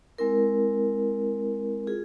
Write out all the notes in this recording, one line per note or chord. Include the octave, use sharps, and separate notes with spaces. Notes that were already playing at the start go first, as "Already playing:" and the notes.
G#3 C4 E4 A#4
F4 G#4